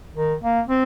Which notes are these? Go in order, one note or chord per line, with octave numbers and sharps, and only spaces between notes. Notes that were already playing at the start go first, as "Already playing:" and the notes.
D#3
A#3
C4